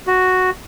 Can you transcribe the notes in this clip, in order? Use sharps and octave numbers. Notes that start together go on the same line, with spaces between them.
F#4